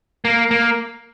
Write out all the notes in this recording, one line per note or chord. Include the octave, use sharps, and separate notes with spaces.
A#3
A#3